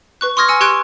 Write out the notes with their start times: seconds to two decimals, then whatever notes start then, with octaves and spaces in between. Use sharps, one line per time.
0.21 B4 C#6 F#6
0.37 C6 C#6 D#6 F6 G#6 A#6
0.48 G#5 E6 C#7
0.61 G4 C6 C#6 F#6 G#6 D7